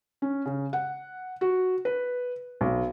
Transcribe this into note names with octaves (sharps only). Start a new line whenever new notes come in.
C#4
C#3
F#5
F#4
B4
B1